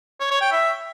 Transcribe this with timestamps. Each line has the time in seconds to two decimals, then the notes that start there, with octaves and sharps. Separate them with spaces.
0.20 C#5
0.31 C#5
0.41 G5
0.52 E5